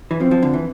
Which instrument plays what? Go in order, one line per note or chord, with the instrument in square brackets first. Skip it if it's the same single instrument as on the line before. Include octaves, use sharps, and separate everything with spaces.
[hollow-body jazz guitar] E3
[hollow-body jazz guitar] F3 [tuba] C4
[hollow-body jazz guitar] F3
D3
E3